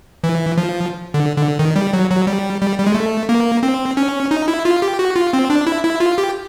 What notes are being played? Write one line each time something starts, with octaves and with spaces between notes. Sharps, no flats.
E3
F3
D3
D3
D#3
G3
F#3
F#3
G3
G3
G3
G#3
A3
A#3
C4
C#4
D#4
E4
F4
G4
F#4
F4
C4
D4
E4
E4
F4
G4